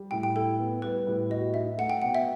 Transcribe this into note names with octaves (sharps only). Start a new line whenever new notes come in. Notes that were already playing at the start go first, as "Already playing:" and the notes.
Already playing: G3
A2 G5
G5
E4 A4
B3
G3 B4
A2
F#4 D#5
D#4 E5
A3 F#5
G5
B2 F#5
E5